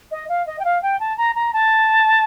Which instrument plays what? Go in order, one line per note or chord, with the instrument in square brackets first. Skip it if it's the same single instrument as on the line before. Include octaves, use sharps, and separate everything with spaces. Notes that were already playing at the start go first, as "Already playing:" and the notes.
[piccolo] D#5
F5
D#5
G5
F5
G5
A5
A#5
A#5
A5